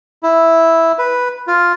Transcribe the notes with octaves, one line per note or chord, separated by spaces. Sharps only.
E4
B4
F4